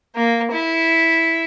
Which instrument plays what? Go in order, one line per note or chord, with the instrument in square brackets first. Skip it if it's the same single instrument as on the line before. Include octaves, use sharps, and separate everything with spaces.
[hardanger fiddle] A#3
E4